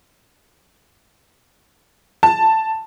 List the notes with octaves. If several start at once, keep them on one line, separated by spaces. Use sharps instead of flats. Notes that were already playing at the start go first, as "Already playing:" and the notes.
A5